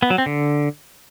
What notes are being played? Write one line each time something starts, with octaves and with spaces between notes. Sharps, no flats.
B3
F#3
C4
D3